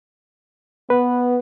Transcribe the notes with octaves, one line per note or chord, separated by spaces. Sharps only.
B3 B4